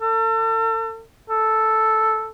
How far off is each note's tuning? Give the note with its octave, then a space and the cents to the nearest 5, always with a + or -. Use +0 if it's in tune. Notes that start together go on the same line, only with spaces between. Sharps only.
A4 +40
A4 +0